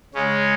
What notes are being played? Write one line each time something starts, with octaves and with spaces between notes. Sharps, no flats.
C#3 G#3 C#4